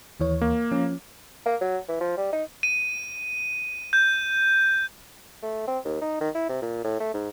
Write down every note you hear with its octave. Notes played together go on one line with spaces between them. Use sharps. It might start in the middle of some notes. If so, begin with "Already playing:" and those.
D#2 E3 C#5
A#3
F3 C#4
A#3
F#3
E3
F3
G3
D#4
D#7
G6
A3
C4
D#2
D#4
D#3
E4
C3
A#2
A2
A3
G#2